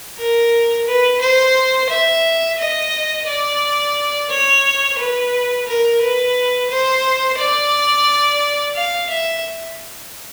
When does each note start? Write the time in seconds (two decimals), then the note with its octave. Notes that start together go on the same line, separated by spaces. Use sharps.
0.17 A#4
0.86 B4
1.21 C5
1.89 E5
2.58 D#5
3.27 D5
4.30 C#5
4.98 B4
5.66 A#4
6.01 B4
6.70 C5
7.38 D5
8.76 F5
9.09 E5